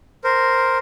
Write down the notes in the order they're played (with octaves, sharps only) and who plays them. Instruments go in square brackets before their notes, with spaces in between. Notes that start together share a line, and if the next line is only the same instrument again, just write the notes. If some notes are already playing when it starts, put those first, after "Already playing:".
[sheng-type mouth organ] A#4 C5